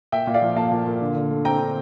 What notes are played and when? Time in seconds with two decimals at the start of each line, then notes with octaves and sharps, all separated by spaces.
0.12 A#2 E5 G5
0.27 A#2
0.34 D5 F5
0.42 F3
0.56 A#3 F5 A5
0.72 A#2
0.86 A#2
1.01 D3
1.16 D3
1.30 A3
1.45 C4 G5 A#5
1.60 D3